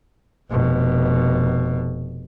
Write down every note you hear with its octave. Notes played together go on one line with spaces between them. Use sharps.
F1 B2